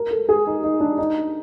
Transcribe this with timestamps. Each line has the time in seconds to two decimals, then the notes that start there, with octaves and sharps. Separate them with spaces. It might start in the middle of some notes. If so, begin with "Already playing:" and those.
Already playing: A#4
0.11 A4
0.29 G#4
0.47 D#4
0.64 D#4
0.80 D4
0.98 D#4